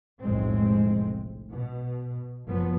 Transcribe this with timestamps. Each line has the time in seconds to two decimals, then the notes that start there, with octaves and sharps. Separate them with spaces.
0.21 F1 B1 A2 G#3 C4
1.51 B2
2.45 F#1 F3 F#3 B3